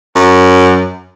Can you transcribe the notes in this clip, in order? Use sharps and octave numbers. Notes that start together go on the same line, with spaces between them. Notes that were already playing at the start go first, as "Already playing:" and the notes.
F#2